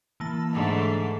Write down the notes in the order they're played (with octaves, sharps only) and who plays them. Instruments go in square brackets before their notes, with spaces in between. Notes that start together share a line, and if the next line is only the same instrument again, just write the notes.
[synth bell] E3 A#3 A5
[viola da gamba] G#2 D3 A3